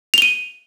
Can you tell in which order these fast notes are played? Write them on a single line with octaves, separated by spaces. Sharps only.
F7 G7 D#7